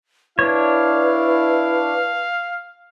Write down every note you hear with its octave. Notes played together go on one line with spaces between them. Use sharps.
D4 E4 B4 C#5 F5